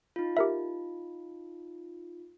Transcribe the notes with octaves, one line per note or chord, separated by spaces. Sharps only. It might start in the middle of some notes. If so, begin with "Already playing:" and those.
D#4 F4
G4 A#4 E5